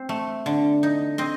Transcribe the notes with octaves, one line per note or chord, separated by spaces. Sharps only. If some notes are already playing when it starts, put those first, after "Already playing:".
Already playing: C4 C5
A3
D3
D#4
C4 D#5